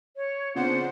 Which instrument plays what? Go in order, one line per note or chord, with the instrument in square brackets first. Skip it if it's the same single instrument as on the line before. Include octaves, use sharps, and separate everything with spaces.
[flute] C#5
[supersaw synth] C#3 D4 C5 [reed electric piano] B3 C4 F4 [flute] F#5